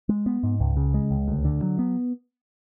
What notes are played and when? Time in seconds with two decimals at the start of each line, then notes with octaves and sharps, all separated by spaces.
0.09 G#3
0.26 B3
0.43 G#2
0.60 C#2
0.77 C#3
0.94 G#3
1.11 C#2
1.28 D2
1.45 D3
1.62 F#3
1.79 B3